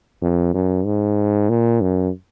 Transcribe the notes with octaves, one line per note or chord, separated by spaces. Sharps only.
F2
F#2
G#2
A#2
F#2